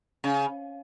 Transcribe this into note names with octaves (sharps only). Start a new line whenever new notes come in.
C#3